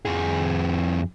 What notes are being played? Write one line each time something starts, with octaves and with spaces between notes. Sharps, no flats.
F2 G#4